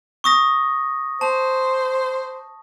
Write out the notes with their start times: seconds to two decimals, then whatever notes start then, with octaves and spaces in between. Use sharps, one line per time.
0.24 C#6 D#6 A#6
1.21 C5 A5